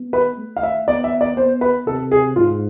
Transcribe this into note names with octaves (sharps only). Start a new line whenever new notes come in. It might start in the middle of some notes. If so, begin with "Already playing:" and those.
Already playing: B3
B4
A3
F5
E5
B3 D5
E5
D5
B3 C5
B4
C3 A4
G#4
G#2 F4